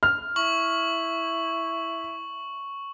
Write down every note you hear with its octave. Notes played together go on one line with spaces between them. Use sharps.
F6
E4 C#6 F#7